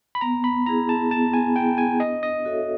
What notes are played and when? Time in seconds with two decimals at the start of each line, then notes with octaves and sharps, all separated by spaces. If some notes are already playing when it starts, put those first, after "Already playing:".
0.15 B5
0.21 B3 A#5
0.44 B5
0.66 E4 G#4 A#5
0.89 A5
1.11 B3 A5
1.33 G#5
1.56 E4 G#4 G5
1.78 G#5
2.00 D4 D#5
2.23 D#5
2.45 F#4 A4 C#5 E5